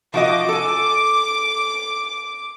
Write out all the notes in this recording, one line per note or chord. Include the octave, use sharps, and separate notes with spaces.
F3 F#4 D#5 D6
A4 G#5